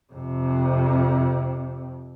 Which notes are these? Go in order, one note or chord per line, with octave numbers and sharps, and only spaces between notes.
F2 C3